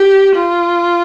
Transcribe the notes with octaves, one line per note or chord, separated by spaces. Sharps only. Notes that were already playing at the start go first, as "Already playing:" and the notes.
Already playing: G4
F4